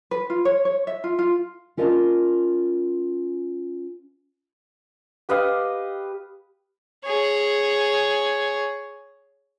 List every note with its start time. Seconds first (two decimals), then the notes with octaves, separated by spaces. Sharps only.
0.11 B4
0.30 F4
0.45 C#5
0.65 C#5
0.87 E5
1.04 F4
1.19 F4
1.77 C#4 F4 A#4 D#5 A5
5.29 G4 B4 D#5 F5
7.05 G#4 C#5